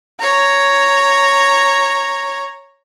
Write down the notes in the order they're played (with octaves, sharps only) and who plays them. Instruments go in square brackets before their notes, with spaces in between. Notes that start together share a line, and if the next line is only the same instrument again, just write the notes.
[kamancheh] C#5 A#5